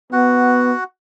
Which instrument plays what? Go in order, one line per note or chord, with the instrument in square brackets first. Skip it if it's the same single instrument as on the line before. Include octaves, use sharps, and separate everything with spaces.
[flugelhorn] B3 [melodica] F#4 F#5